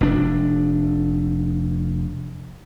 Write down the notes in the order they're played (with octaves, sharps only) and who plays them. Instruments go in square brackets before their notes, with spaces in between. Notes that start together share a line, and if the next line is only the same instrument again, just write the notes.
[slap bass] F1 D4